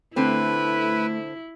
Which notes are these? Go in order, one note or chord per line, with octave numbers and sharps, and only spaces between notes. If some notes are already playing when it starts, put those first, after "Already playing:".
D3 A3 C4 E4 B4